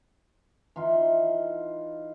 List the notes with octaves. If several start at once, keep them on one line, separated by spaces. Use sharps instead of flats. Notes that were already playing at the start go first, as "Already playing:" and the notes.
E3 D#4 F4